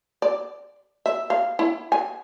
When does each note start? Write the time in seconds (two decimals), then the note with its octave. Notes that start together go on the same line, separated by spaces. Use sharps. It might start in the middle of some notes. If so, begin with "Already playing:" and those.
0.22 D5
1.06 E5
1.30 F5
1.59 E4
1.92 G#5